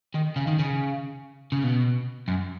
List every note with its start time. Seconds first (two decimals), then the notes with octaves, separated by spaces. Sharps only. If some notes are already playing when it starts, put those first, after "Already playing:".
0.15 D#3
0.36 C#3
0.47 D#3
0.59 C#3
1.52 C#3
1.64 B2
2.28 F#2